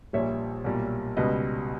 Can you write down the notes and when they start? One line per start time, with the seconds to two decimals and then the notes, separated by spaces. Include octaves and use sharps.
0.13 A#1 A#2 G3 C#5 E5
0.64 B1 A#2 G3
1.17 C#2 B2 G3 B4 D#5